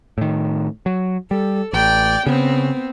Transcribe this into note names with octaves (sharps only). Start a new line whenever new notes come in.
A2 D#3
F#3
G3 A4
A1 D5 G5
C#3 B3 C4